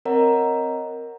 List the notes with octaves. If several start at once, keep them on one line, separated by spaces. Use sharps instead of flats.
C4 A#4 C#5 D#5 F#5 A#5